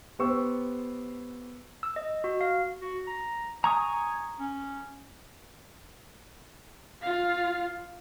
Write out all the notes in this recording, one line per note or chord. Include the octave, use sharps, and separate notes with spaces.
B3 G4 C5 C#6 E6
E6
D#5
F#4
F5
F#4
A#5
G#5 A#5 C#6 D#6
C#4
F4 F5